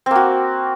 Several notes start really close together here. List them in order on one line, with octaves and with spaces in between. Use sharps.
C4 A#3 F#4